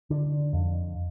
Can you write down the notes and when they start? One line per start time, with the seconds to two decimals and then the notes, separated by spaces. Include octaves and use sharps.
0.10 D3 D4
0.53 F2